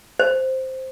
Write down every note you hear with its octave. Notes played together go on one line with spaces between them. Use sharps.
C5